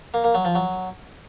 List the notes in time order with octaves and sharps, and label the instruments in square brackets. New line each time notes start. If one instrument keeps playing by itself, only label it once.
[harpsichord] A#3
A#3
F#3
F3
F#3